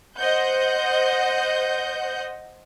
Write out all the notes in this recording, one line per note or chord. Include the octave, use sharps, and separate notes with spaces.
C5 D#5 F#5 G6